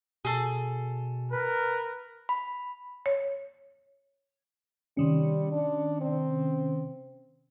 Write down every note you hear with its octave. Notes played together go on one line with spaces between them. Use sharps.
B2 G#4 A4
A#4 B4
B5
C#5
C3 D#3 G3 C#4
D4
C4